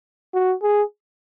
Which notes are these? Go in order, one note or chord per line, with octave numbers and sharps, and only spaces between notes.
F#4
G#4